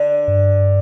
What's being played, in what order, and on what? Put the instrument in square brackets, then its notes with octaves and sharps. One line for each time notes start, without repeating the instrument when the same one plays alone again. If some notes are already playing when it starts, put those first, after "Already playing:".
Already playing: [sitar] D3
[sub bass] G2